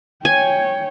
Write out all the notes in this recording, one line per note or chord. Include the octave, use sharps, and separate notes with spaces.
C#5 G5 G#5